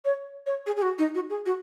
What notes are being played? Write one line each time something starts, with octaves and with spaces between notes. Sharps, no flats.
C#5
C#5
G#4
G#4
F#4
D#4
F#4
G#4
F#4